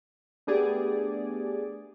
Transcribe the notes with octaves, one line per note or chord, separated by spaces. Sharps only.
A3 B3 D4 G4 G#4 D5